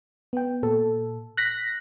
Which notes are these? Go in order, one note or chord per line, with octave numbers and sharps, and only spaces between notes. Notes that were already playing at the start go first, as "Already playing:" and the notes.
B3 G5
A#2 A4
F#6 A#6 B6